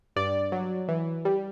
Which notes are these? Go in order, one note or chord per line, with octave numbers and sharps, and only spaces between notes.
G2 D5
F#3
E3
G3